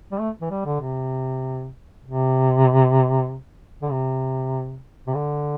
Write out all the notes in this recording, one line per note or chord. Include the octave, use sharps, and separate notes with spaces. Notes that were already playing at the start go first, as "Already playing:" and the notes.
G3
A3
E3
G3
D3
C3
C3
D3
C3
C3
D3